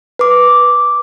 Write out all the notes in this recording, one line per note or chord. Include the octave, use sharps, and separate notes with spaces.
B4 D6